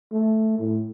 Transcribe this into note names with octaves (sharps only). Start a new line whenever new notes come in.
A3
A2